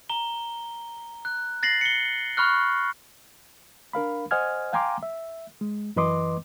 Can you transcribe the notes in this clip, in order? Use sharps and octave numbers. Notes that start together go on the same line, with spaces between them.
A#5 G7
F#6
A6 A#6 C7 F#7
C#7 G7
B5 C#6 F6 F#6
D4 A#4 F5 B5
C5 D#5 F#5 G#5 F6 G#6
F5 G5 G#5 A#5 C6 D6
E5
G#3
F#2 E3 B4 D#5 C6 D6